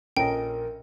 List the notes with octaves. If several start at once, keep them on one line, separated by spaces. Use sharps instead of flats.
A#1 C#4 A4 A#4 D#5 G5 A#5